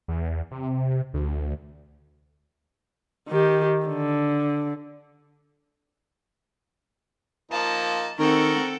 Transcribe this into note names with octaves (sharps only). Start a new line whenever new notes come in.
E2
C3
D2
D#3 G4
D3
F3 A#3 D#4 A5
D#3 C4 A4 A#4 F#5 G5 C#6